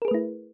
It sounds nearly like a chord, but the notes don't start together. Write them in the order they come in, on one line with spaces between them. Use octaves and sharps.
A#4 G#4 B4 A3 E4